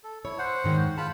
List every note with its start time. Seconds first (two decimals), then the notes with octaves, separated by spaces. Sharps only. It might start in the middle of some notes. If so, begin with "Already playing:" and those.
0.04 A4
0.25 E4 C#5
0.39 C5 F#5
0.64 G#2 D#3 C#5
0.98 F4 A5 B5